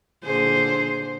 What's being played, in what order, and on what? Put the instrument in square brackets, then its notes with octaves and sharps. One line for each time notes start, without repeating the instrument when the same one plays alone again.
[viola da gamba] A#2 D3 G#4 [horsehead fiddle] C5